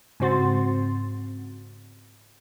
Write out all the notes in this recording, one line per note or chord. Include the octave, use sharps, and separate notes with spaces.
G#2 C#3 C4 F#4 C6 A6